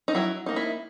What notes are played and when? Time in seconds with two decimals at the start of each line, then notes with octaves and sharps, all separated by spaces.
0.08 D#4
0.15 F#3 E4
0.46 A#3 D#4
0.56 E4